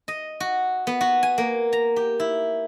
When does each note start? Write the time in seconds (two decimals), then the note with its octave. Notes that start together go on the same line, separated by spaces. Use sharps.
0.08 D#5
0.40 F#4
0.87 B3
1.01 F#4
1.23 G#5
1.38 A#3
1.73 A#5
1.96 G4
2.20 E4